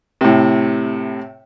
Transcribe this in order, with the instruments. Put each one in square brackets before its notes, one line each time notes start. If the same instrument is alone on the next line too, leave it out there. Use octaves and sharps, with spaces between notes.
[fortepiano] A2 C3